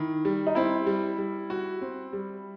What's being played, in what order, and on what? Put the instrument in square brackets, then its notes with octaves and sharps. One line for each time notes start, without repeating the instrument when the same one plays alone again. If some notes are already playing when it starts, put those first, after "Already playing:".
Already playing: [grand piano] D#3 [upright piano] E4
[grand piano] G3
[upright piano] D#4
[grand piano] C4 [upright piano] E4
[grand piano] G3
G3
F#4
C4
G3